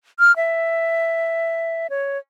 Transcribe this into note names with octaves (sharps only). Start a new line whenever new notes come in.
F6
E5
C#5